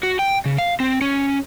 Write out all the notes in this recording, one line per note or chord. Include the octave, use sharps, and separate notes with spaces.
F#4
G5
C#3
F5
C4
C#4